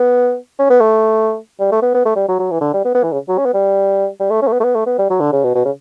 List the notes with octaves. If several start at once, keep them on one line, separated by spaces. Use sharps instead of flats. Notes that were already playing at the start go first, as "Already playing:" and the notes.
Already playing: B3
C#4
B3
A3
G3
A3
B3
B3
A3
G3
F#3
F#3
E3
D3
G3
B3
B3
E3
C#3
F#3
C#4
B3
G3
G3
A3
C#4
A3
B3
A3
B3
A3
B3
G3
F#3
D3
C#3
B2
B2
C#3